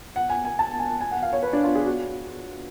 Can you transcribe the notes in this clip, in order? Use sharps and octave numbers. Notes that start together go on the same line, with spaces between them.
F#5
G#5
G#5
A5
G#5
G#5
F#5
F5
C#5
B4
D4
F4
G#4
F#4